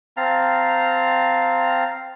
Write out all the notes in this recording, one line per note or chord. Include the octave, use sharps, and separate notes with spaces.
C4 F5 A5 A#5